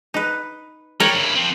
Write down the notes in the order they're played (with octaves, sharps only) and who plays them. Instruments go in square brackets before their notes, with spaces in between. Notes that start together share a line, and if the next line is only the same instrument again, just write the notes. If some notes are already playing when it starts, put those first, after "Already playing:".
[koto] D#4 B4
[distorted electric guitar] G3 [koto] A#4 C#5 G5
[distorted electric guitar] G2 E4
F3 C4